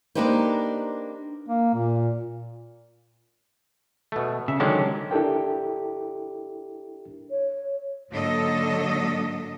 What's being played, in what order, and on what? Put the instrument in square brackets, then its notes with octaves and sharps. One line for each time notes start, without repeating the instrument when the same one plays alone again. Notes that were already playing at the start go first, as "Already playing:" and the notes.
[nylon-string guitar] A#3 D4 D#4 G4 B4 C5
[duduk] A#3
A#2
[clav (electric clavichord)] B2 A3
[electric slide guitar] C#3 [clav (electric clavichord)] E5
[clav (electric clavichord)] D3 D#3 G#3 [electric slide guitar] F#3 C#4 G4
[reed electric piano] D4 E4 G4 A4 A#4 G5
[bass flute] C#5
[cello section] G#2 D3 F#3 A#3 A4 D#5